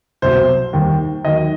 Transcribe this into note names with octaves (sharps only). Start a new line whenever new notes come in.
C2 B2 F#3 C5
D#2 D#3 G3
D#2 D#3 F#3 D#5